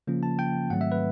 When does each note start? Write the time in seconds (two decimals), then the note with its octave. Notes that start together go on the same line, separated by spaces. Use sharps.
0.07 C#3 F3 A#3 C#4 F4
0.23 A5
0.39 G5
0.70 G#2 D#3 F#3 A3 C4 F#5
0.81 E5
0.92 B4